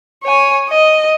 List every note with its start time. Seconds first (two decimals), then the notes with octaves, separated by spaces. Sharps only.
0.23 C#5 G#5
0.69 D#5